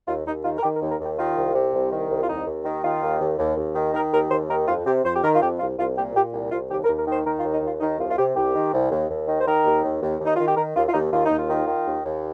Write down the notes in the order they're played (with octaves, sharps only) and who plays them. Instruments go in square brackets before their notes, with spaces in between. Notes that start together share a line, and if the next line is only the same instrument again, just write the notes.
[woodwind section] D#2 F4
D#2 D#4
D#3 F4
A#4
D#3 G4
A#4
D#2
A#4
D#2 G4
D#3 F4
C2
C3
C2
D#3
C2
F4
D#2 D#4
D#2
D#3
D#3 F4
D#2
D#2
D#2
D#2
D#3
D#3 A#4
D#2 A#4
D#2 C5
D#3 A#4
F2 F4
C3 G4
F2 C5
G4
D#3 A#4
F4
F2 G4
C2 F4
C2 F4
A#2 G4
A#2 G4
C2
C2 F4
D#2 G4
A#4
D#2
A#4
D#3 C5
D#3 A#4
F4
D#2
D#4
D#2 F4
D#3 D#4
C2 F4
F4
C3 G4
C2 G4
D#3
C2
D#2
D#2
D#3
C5
D#3 A#4
D#2
D#2
D#2
D#2
D#4
D#3 F4
G4
D#3 A#4
D#2 F4
F4
D#2 D#4
D#2 F4
D#4
D#2
F4
D#3
D#3
D#2
D#2